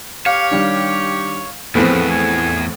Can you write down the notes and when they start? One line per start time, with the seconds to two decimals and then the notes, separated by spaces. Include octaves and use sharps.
0.26 G4 C#5 F5
0.51 D#3 G3 D4
1.75 E2 A2 E3 F3 B3 C4 G#4 B4
2.10 G#5